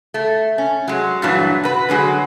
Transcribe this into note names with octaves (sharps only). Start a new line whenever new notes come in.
A3
C#4
F#3 G#3
G2 A#2 E3 F#3 D4
F#4 B4
D3 F#3 G#3 F#4